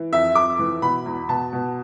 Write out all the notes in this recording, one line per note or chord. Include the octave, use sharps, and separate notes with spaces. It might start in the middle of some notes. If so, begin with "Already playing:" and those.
Already playing: E3
F2 E5
F2 D6
E3
B2 B5
E2
B2 A5
B2